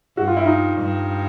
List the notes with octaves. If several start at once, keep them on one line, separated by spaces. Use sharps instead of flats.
G2 F#4
F4
E4
D#4 F4
G2